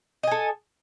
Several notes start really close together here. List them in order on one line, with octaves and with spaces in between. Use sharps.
D#5 G#5 A4